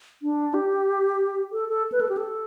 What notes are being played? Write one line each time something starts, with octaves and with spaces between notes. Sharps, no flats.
D4
G4
A4
A4
B4
A4
G4
A4